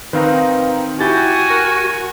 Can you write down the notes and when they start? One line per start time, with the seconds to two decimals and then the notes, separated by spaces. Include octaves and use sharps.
0.13 D#3 C4 D#4 B4 F5 A#5
1.01 E4 F#4 G4 G#5 G6 A6
1.50 A#4